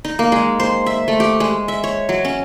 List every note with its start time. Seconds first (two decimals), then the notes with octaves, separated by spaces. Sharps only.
0.05 D#4
0.19 A#3
0.32 G#3
0.60 C5
0.86 E5
1.08 A3
1.20 G4
1.40 G#3
1.68 E5
1.84 C#5
2.09 F#3
2.25 C#4